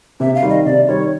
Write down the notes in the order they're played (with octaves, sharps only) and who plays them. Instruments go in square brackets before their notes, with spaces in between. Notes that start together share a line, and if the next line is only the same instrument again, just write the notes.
[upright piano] C3 [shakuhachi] E5
[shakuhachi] F5
[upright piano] D#3 G3
[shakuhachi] D#5
[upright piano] C3 [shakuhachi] D5
[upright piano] D#3 G3 [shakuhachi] C#5